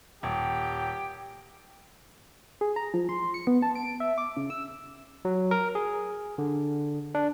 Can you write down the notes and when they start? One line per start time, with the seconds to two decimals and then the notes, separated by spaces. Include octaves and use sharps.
0.23 D#1 G4 G5
2.61 G#4
2.76 A#5
2.94 F3
3.09 C6
3.34 C#7
3.47 B3
3.62 A5
3.75 D7
4.00 E5
4.18 D6
4.37 C#3
4.50 E6
5.25 F#3
5.51 A#4
5.75 G#4
6.38 D3
7.15 D4